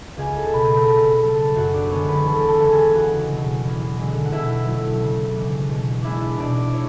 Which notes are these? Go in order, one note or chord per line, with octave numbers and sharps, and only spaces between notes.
C#2 G#4 G#5
A4 A5
B2 A3 B4 B5
A4 A5
C#3 B4 B5
F#3 B3 A4 A5
F#2 F#4 F#5
D4 D5
D3 G#3 B3 C#5
B4
E2 A4 A5
A4 A5
C#3 G#3 C#4 E4
G#4 G#5
C#2 F#4 F#5
B2 F#3
E2
D3 G#3
F#5
B2 E4 E5
F#3 A3 C#4 E4
C#3
E3 G#3 D4
B2
G#3 B3 D4 E4 E5
B2 D4 D5
E4 C#5